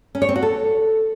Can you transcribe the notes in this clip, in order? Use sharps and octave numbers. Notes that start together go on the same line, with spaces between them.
C#4
C#5
C4
F#4
A4